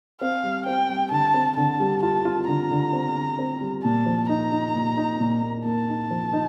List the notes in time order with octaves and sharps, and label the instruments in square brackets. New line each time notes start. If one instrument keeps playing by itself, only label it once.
[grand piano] C4 [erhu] F5
[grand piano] G3
[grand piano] C4 [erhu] G5
[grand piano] G3
[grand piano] D3 [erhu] A5
[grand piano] C4
[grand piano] D3 [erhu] A5
[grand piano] G3
[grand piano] F4 [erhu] A5
[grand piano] F4
[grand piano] D3 [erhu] A#5
[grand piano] D3
C4
D3
C4
G3
[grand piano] A#2 [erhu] A5
[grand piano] F3
[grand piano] D#4 [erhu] A#5
[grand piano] D#4
A#2
D#4
A#2
A#3
[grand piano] A#3 [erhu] A5
[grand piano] D#4
F3
D#4